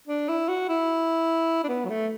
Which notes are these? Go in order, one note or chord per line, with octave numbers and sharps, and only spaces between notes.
D4
E4
F#4
E4
D4
B3
F#3
A3